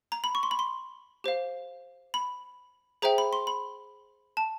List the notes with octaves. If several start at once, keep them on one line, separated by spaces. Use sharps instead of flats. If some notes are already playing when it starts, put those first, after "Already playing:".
A#5
B5
C#6
C6
B5
C6
G4 C5 F5
B5
G#4 C5 E5 G5 A#5
B5
C6
B5
A5